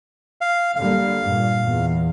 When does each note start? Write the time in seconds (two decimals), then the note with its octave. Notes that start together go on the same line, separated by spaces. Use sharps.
0.41 F5
0.76 D3 G3 A#3 F5
1.21 G2 A#2
1.65 E2